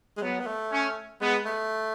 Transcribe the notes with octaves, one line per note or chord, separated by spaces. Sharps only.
G#3
F#3 B3
B3
A3
C#4
G#3 B3
A3